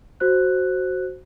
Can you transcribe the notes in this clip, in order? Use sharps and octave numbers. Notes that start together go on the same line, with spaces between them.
F#4 C5 F#6